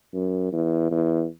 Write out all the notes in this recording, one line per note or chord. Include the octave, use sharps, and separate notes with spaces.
F#2
E2
E2